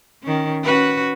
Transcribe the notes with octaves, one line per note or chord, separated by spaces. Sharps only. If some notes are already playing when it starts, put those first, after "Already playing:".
D#3 C#4
C#4 F#4 B4